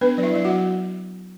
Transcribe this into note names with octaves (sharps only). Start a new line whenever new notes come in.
B3 D4 B4
F#3 D5
E4 E5
F#3 E5
F#4 F#5
F#3